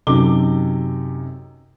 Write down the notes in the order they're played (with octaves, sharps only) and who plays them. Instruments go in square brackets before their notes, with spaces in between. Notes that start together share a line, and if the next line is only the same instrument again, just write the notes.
[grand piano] F#2 C3 D#4 A4 D6 G7